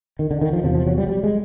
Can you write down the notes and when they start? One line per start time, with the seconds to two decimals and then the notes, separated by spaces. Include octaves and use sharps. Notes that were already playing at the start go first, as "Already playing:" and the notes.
0.19 D#3
0.31 D3
0.41 D#3
0.53 F3
0.63 E2 C3 F3
0.75 F3
0.87 F#3
0.98 G3
1.08 G3
1.23 G#3